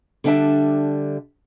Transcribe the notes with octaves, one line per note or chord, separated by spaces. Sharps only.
D3 G3 D4 E5 A5